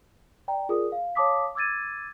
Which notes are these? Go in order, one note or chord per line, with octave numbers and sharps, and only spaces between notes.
D5 G5 A#5
F4 G#4 A#4 D5 D#6
F5
C#5 F5 A5 D6 D#6 B6
D6 E6 G#6 A6 D#7